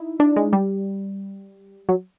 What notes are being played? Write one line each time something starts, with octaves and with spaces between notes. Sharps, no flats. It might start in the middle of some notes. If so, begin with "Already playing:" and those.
Already playing: D#4 E4
D4
G#3
G3
F#3